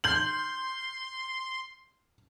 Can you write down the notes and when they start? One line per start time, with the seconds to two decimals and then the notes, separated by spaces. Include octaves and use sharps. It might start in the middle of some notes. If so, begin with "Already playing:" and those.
0.04 C6 G6 F#7